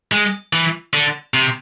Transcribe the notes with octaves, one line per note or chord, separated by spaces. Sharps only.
G#3
E3
D3
C3